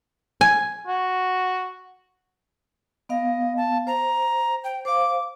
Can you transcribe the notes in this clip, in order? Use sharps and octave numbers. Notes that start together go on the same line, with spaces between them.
G#5
F#4
B3 D#5 F5
A5
C5 A#5
G5
C5 F5 D6